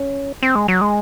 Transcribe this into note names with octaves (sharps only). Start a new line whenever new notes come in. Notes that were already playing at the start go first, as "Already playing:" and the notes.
Already playing: C#4
C4
G#3
F#3
G#3